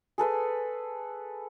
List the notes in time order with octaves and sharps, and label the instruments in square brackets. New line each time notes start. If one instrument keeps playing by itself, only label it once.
[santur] G#4 A4 B4 C6